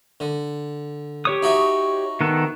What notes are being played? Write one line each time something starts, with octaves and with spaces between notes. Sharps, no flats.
D3
G4 C#5 D#6
D#4 F#4 E5
D#3 B3 A4